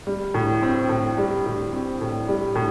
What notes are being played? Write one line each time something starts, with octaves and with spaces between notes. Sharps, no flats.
G3
A2
C4
A2
G3
A2
C4
A2
G3
A2